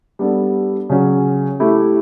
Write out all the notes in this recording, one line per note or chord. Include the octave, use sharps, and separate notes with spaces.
G3 B3 D4 A4
C#3 F#3 C#4
A3 E4 G4